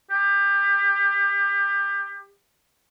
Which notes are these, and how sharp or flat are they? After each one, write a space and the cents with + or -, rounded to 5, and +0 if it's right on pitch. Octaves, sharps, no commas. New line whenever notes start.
G4 +25